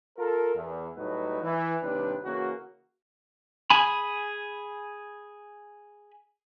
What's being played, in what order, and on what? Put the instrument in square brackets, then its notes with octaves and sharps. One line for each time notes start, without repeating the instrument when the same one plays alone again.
[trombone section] F4 A4 A#4
E2
A2 F#3 G3 D#4 B4
E3
D#2 C3 G3 D4 B4
C#3 E3 A#3 F#4
[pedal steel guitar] G#4 G#5 B5